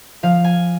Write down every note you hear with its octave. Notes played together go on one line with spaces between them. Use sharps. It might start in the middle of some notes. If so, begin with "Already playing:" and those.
F3 F5
G#5